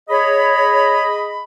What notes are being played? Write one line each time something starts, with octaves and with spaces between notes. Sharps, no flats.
G#4 C#5 D#5 B5